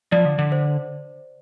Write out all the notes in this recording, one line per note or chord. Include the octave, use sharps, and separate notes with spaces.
F3 D5
D3
D3
C5